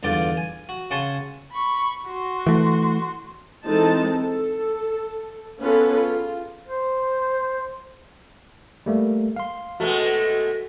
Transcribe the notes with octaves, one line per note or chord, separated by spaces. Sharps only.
E2 G2 D3 F4 D5 G5
G#5
F#4
C#3 F#5 G#5 A5 C6 C#6
B5 C#6
F#4 C6
E3 A3
E3 G#3 C4 D#4 A4 A5
A4
B3 C#4 F4 G#4 A4 B4
F4
C5
G3 A3 A#3
F5 C6
B2 G#3 A3 F#4